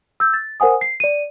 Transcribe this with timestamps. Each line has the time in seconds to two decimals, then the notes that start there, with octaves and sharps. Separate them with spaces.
0.20 E6 G6
0.34 A6
0.60 A#4 C5 F#5 G#5 D#6
0.81 C7
1.00 D5 D#7